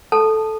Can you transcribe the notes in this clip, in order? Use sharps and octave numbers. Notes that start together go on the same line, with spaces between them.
A4 A5